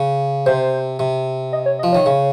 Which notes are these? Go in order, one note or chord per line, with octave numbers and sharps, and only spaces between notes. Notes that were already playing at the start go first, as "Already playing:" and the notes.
Already playing: C#3
C3 C5
C3
D#5
C#5
D#5
F3
D#3 C#5
C#3